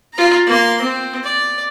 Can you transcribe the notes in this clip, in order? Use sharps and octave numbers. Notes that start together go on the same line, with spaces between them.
F4 A#5
A#3 C6
C4
D5